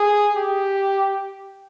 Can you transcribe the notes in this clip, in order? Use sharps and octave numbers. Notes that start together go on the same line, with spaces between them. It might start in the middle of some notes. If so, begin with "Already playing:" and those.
Already playing: G#4
G4